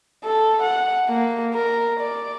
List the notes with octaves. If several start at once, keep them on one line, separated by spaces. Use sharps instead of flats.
A4
F#5
A#3
A#4
D5